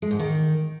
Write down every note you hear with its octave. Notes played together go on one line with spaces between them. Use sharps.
G#3
G#2
D#3